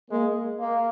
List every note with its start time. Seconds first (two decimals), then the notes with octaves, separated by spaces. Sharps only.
0.11 G#3 A#3
0.60 A#3